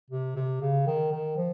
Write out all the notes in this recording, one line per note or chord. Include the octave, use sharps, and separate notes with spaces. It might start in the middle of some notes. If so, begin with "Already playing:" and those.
C3
C3
C#3
D#3
D#3
F3